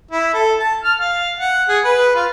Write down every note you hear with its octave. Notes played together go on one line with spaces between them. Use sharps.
E4
A4
A5
F6
F5
F#5
G#4
B4
F4